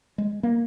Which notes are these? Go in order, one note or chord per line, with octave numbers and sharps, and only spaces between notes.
G#3
A#3